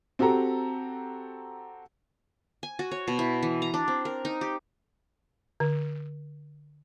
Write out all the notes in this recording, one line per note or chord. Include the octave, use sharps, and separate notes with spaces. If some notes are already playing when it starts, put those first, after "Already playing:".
C4 F#4 G4 A4 A#5
G#5
F#4
C#5
B2
E4
E3
A#5
D4
C4
A#4
D#4
G4
D3